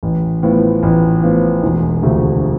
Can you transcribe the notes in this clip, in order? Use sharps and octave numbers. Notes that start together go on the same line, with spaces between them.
A1
A2 F3 B3
A1
A2 F3 B3
E1
D2 C3 F3 A3